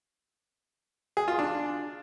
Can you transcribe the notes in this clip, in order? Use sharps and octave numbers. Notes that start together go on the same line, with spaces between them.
G#4
F4
D4